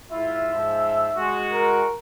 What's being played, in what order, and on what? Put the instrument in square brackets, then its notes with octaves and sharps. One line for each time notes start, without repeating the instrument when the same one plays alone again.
[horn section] G#2 E4 F4 [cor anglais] E5
[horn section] G#2 F3
G#3 F#4
[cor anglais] A#4